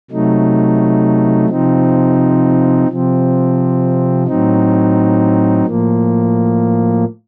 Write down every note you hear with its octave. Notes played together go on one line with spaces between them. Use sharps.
C3 F#3 A3 D#4
C3 F3 C4 D#4
C3 F3 C4
A2 F#3 C4 D#4
A2 F3 A#3